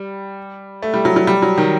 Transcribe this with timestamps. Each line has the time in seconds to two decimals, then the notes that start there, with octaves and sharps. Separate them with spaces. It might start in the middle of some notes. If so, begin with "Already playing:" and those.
Already playing: G3
0.82 A3
0.94 G3
1.05 F#3
1.16 F#3
1.27 G3
1.42 F#3
1.58 D#3